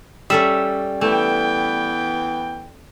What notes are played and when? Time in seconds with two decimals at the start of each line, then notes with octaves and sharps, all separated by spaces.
0.30 G3 C#4 A4 E5
1.01 E3 A3 B3 G5